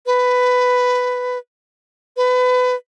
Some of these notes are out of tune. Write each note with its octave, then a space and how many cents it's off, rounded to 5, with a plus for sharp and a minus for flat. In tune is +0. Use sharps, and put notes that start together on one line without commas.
B4 +10
B4 +25